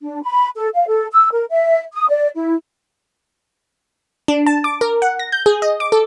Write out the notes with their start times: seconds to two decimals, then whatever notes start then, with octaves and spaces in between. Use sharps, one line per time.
0.01 D4
0.23 B5
0.56 A4
0.75 F5
0.88 A4
1.12 E6
1.32 A#4
1.50 E5
1.93 D#6
2.09 D5
2.35 E4
4.28 D4
4.46 A5
4.64 D6
4.81 A#4
5.02 F#5
5.19 A#6
5.32 G6
5.46 G#4
5.62 D#5
5.80 D6
5.92 A4